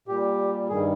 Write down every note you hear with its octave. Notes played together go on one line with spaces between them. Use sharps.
A#2 G3 G4
G2 D#3 G3 G#4